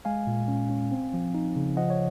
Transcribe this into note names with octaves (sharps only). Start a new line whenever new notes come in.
G#3 F5 G#5
A#2
C#4
C#4
C4
F3
D#4
C#3
F3 D#5 F#5
C#5